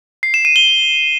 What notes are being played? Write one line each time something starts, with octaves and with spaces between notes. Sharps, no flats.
C7
E7
D#7
G7